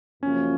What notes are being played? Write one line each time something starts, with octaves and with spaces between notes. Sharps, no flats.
F#2 C#3 F3 A#3 C#4